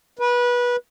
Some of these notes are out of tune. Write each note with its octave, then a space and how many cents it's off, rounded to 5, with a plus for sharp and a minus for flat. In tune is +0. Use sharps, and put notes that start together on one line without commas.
B4 -20